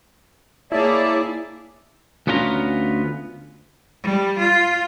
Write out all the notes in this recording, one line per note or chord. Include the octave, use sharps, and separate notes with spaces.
A#3 E4 G#4 C#5 D5 E5 A5
D2 B3 C#4 F4 G5 A#5
G3
F4